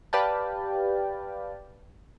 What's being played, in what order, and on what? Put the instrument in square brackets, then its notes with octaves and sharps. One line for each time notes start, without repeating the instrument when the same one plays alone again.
[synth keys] G4 B4 D5 F5 G5 A5